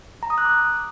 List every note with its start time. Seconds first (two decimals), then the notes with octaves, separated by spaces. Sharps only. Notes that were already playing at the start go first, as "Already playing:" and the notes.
0.23 A#5
0.30 D#6
0.38 F#6
0.45 D6